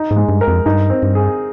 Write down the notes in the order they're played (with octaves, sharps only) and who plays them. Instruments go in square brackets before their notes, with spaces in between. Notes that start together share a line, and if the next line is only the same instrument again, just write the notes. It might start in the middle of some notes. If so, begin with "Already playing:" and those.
Already playing: [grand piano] D#4
[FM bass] G#2
[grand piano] G#3
[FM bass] G2
[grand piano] A#4
[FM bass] F2
[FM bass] G2 [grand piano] D#4
[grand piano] C4
[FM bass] G2
[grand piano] G#4